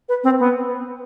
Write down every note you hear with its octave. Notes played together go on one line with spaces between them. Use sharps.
B4
C4
B3